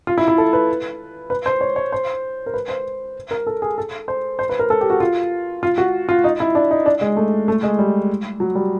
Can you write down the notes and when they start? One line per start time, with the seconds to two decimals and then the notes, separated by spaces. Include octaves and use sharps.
0.07 F4
0.18 E4
0.28 E4
0.38 A4
0.53 B4
1.30 B4
1.46 C5
1.61 C#5
1.76 C#5
1.92 C5
2.46 A#4
2.54 B4
2.69 C5
3.31 A#4
3.47 A4
3.62 G#4
3.78 A4
4.08 C5
4.39 C5
4.49 B4
4.59 A#4
4.70 A4
4.81 G4
4.90 F#4
5.00 F4
5.63 F4
5.78 F#4
6.09 F4
6.24 D#4
6.40 E4
6.55 D4
6.71 D#4
6.86 D4
7.01 G#3
7.17 A3
7.48 A3
7.63 G#3
7.79 G3
8.40 F#3
8.55 G3